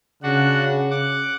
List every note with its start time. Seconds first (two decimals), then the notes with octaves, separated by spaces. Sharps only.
0.23 C#3 D4 F#4 F#5
0.90 F#5 D6